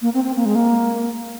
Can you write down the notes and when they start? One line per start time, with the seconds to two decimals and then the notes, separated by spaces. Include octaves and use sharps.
0.02 A#3
0.14 C4
0.24 C4
0.36 A#3
0.46 G#3
0.55 A#3